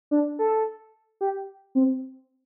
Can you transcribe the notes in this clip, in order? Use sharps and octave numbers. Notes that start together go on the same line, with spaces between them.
D4
A4
G4
C4